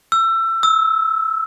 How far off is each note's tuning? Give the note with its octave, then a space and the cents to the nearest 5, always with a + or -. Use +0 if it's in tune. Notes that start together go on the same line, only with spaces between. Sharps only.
E6 +25
E6 -20